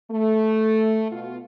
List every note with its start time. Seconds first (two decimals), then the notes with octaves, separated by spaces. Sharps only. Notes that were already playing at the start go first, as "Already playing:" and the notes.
0.11 A3
1.12 B2 F4